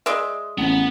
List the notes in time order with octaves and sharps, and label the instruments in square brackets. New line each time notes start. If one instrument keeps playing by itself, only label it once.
[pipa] G#3 D5 E5
[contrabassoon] A1 [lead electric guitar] B3 F#5